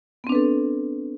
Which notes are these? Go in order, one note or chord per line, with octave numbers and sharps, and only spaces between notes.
B3 C4 D4 A4 B4